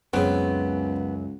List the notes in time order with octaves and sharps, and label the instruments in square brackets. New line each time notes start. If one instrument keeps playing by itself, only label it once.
[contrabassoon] C#2 [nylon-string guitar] F#2 [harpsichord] C#3 C4 [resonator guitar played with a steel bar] B3